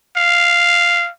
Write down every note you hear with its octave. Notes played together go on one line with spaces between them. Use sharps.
F5